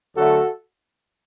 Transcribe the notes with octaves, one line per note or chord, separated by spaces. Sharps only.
D2 D3 F#3 A3 F#4 A4